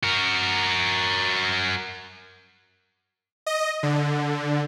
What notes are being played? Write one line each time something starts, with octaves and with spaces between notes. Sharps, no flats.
F#4 A#4
D#5
D3